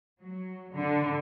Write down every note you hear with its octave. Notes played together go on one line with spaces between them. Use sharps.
F#3
D3